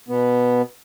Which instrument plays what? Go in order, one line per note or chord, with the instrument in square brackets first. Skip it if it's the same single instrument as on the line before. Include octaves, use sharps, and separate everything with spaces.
[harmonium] B2 B3